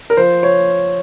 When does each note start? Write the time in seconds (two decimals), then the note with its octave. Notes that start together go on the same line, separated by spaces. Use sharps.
0.10 A#4
0.17 F3 C5
0.43 C#5